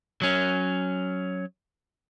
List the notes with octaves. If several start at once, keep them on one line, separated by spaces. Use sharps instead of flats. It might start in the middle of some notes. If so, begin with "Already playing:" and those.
F#3 C#4